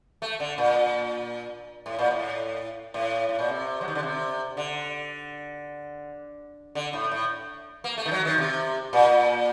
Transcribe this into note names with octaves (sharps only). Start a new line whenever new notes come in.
A3
D3
A#2
A2
A#2
A2
A2
A2
A#2
C3
F#3
D#3
D3
C3
D3
D3
A2
A2
A#3
A3
D#3
F#3
D#3
C3
A#2